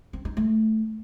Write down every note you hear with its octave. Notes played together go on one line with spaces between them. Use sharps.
C4
D#4
A3